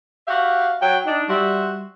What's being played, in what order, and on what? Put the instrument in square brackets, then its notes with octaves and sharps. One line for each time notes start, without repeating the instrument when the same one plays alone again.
[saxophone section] F#4 G4 E5 [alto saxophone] F5
[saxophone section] F#3 [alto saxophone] G5
[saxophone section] D4 [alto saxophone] D#4
[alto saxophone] G3 [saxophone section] F#4 C5 E5